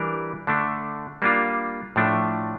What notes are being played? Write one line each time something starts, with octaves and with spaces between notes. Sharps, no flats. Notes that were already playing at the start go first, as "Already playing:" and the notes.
Already playing: E3 G3 D4 G4 A#4
D3 A3 D4
G3 A#3 D4 F4
A2 F3 A3 D4